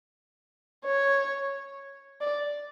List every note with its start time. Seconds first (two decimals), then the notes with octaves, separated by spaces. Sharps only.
0.85 C#5
2.21 D5